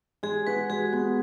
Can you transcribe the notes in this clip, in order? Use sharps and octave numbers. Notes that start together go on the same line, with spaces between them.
G#3 G#4
F#4 B4
G#3 G#4
B3